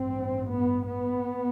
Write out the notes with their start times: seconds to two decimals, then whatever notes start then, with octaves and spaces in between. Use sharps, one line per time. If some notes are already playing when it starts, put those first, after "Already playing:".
Already playing: A1 G2 C4
0.52 B3
0.87 B3